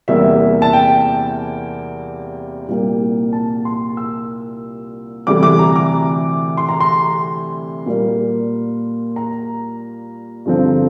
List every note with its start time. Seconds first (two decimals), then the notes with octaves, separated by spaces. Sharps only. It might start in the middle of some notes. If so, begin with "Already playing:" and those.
0.08 E2 C3 G3 A#3 E5
0.62 A5
0.73 G5
2.68 C2 A#2 G3 A#3
3.33 A5
3.65 C6
3.97 E6
5.27 D2 C3 E3 G3 D6
5.43 D6
5.59 A#5
5.76 D6
6.57 C6
6.69 A#5
6.80 C6
7.86 A#2 G3 A#3
9.16 A#5
10.46 G2 D3 F3 C4